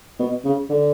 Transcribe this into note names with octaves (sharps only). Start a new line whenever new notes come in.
B2
C#3
D3